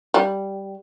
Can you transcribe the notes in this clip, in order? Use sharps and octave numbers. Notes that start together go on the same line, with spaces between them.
G3